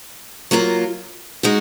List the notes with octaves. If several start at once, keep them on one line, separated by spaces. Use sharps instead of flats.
F#3 A#3 F4 A#4
G#3 D#4 F#4